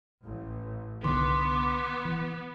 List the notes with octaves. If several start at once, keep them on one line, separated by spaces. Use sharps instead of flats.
A1
C2 D3 D#3 B3 C6 D6
E3